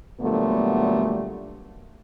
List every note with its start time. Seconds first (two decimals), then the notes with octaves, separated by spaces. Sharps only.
0.21 A#2 D3 F#3 G3 A3 B3